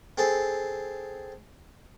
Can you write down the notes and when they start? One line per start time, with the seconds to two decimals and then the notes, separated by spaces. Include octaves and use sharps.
0.18 C4 G#4 A4